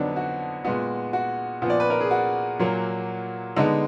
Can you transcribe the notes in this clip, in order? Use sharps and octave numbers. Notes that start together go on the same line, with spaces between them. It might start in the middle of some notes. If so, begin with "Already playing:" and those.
Already playing: F2 D3 F#3 B3 D4 D#4
F#4
A#2 G#3 B3 F#4
F#4
A#2 F3 B3
D5
B4
A#4
G#4
F#4
A#2 F#3 A#3
D3 G#3 B3 D#4